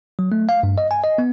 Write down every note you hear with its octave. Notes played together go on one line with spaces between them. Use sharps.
F#3
A3
F5
G2
D#5
G#5
D#5
B3